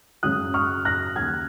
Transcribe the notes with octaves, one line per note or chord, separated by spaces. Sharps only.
F#2 C#3 F#3 D#6 F#6
C#6 F6
F#6 A#6
D#2 C#3 F#3 A#3 F6 G#6